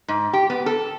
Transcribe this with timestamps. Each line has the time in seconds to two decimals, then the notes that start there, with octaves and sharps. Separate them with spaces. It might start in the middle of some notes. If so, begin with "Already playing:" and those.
0.08 G#2
0.33 G4
0.50 B3
0.66 A4